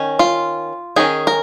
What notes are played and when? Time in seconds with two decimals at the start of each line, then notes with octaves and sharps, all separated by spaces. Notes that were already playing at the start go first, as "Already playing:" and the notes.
Already playing: D#3 C#4
0.19 F4
0.96 D#3 C#4 G#4
1.27 A#4